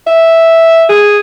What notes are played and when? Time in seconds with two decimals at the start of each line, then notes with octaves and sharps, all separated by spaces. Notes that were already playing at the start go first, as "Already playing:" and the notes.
0.07 E5
0.89 G#4